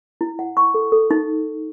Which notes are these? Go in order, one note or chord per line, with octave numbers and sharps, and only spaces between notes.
E4
F#5
C#6
A4
A4
D#4